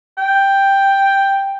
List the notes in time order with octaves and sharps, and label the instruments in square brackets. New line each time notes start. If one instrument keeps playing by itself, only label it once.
[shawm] G5